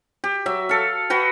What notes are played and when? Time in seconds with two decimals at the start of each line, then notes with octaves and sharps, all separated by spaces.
0.24 G4
0.46 F#3 E5
0.69 A4 F5
1.10 F#4 B4 G5